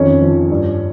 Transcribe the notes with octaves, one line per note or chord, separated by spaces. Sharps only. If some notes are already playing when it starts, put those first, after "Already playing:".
Already playing: F2 D#3 C#4 C#5
F3
G2